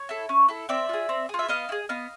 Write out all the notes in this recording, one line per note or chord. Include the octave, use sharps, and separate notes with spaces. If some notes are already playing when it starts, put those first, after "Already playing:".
Already playing: C#5
E4 A4
C#4
E4 A4
C4 D5 E5
F4 G#4
C4
F4 G#4
E5
B3 D#5 F5
E4
G#4
B3 D#5 F5